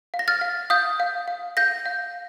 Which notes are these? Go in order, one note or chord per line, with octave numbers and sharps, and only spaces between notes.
F5
A#6
F6 A6
F5
F5 D#6 G6
F5
F5
F5 G6 A#6
F5